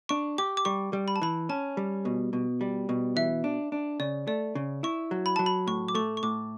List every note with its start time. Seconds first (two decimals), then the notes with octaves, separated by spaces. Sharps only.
0.09 D4 C#6
0.38 G4 D6
0.57 D6
0.65 G3 C#6
0.93 G3
1.08 B5
1.16 A5
1.22 E3 B5
1.49 C#4 A5
1.77 G3
2.05 B2
2.33 B2
2.61 G3
2.89 B2
3.16 E3 E5
3.44 D4
3.72 D4
4.00 C#3 D5
4.27 A3 D5
4.55 C#3
4.83 E4 C#6
5.11 F#3
5.26 B5
5.36 F#3 A5
5.46 B5
5.67 A2 C#6
5.88 D6
5.95 A3 C#6
6.17 C#6
6.23 A2 D6